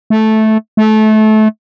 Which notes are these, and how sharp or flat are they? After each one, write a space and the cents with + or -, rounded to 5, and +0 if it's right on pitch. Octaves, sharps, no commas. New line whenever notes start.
A3 -10
A3 -25